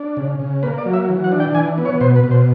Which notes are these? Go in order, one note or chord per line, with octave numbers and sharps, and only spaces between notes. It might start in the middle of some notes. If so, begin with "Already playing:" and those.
Already playing: D4
C#3
C#3
A#3 B4
D5
F#3
E5
E3
F#5
D4
G5
E3 G#5
B3
C#5
B2 C5
B4
B2
C5